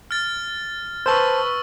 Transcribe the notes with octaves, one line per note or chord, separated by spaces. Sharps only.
F6 A6
B4 C5 A5 C#6 E6 F6